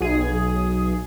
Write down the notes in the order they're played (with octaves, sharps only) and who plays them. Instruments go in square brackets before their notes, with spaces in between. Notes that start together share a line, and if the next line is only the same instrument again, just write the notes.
[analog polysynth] B1 G#4